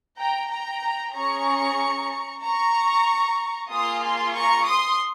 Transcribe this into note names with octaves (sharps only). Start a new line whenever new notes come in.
G5 A#5
G5 A#5
C#4 G#4 A#5 C#6
A#5 C#6
A#3 F4 G#4 C6 D#6
G#5 C6
A#5 C#6
C6 D#6